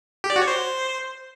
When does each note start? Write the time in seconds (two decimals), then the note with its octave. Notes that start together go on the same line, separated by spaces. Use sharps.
0.24 G4
0.30 D5
0.36 F#4
0.42 C#5
0.48 C5